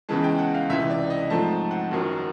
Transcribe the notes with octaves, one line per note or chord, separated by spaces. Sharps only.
E2 C#3 E3 G#3 A5
G5
F#5
F5
C#2 C3 E3 E5
D5
D#5
G#2 F3 A3 C4 A5
F#5
F#1 F#2 D#3 F#3